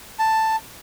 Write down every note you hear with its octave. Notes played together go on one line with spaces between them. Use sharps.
A5